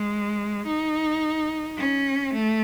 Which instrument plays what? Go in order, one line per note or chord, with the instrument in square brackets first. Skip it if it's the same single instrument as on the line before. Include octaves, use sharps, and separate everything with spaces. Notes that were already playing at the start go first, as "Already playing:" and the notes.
Already playing: [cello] G#3
D#4
C#4
A3